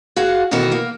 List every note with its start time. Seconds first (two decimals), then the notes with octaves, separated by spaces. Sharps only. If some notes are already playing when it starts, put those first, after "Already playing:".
0.16 F#4 G#4 F5 F#5
0.51 B2 D#3 E3 D#4 F#4 A4
0.72 A#3